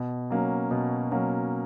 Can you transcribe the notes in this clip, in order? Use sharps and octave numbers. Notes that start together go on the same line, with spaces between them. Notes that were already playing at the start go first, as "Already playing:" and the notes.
Already playing: B2
F#3 A#3 C#4
B2
F#3 A#3 C#4